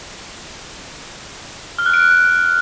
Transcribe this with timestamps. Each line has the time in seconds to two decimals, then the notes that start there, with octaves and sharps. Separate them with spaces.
1.79 F6
1.86 F#6
1.94 D7